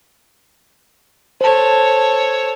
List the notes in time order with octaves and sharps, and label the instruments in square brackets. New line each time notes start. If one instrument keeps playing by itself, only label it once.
[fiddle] A4 C#5 [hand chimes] C5 A5